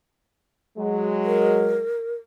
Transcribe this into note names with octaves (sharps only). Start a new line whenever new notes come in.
F#3 G#3
A#4